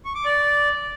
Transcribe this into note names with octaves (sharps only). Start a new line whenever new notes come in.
C#6
D6
D5